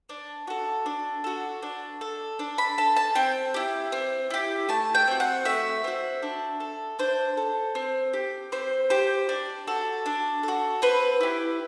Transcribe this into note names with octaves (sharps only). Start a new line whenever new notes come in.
D4
F#4 A4
D4
F#4 A4
D4
A4
D4
B5
A4 A5
A5
C4 G5
E4 G4
C4
E4 G4
A3 A5
G5
C4 F#4
F#5
A3 E5
C4 F#4
D4
A4
D4 C5
A4
C4
G4
C4 C5
G4 C5
D4
F#4 A4
D4
F#4 A4
C4 B4
E4 G4